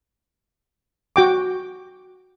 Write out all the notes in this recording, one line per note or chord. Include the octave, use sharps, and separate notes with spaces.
F#4 G5 D6